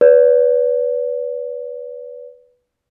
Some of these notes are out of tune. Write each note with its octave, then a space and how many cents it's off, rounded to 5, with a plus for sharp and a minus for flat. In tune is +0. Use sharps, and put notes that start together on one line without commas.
B4 +0 D5 -45